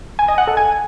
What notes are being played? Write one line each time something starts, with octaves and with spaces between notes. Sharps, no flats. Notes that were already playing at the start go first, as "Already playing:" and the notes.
G#5
D#5
F#5
A4
G#5